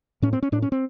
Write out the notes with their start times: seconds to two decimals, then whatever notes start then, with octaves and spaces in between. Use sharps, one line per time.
0.22 A2 C#4
0.33 C4
0.43 C#4
0.52 A2 D4
0.62 C#4
0.72 C4